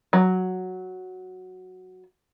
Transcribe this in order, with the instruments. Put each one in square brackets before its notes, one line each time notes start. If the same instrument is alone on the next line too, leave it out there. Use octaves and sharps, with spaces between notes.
[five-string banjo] F#3